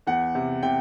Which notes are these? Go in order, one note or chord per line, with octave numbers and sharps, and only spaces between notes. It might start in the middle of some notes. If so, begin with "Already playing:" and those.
E2 F#5
C3
C3 G5